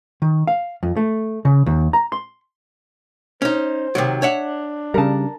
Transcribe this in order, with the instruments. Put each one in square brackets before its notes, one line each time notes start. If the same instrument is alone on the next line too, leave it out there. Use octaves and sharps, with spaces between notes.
[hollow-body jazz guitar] D#3
F5
F2
A3
C#3
D#2
A#5
C6
[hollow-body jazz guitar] C#4 D#4 [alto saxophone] C5
[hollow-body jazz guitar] C3 D#3 F#3
[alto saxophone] D4 [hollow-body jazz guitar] C#5 E5 F#5
[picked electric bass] C#3 G3 [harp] A#4 A5